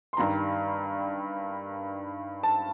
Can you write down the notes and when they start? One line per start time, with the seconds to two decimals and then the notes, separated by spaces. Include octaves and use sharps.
0.13 C6
0.17 G2 D#3 G3 A#5
2.43 A5